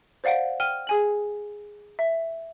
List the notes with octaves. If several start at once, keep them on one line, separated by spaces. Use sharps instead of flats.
C5 D5 F5 F#5 D7
G5 F6 D#7 G7
G#4 G#5 F#7
E5